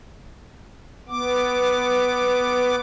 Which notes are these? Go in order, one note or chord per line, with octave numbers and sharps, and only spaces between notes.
B3 D6